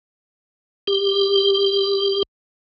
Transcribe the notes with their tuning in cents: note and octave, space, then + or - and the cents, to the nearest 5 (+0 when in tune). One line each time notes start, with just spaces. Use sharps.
G4 +15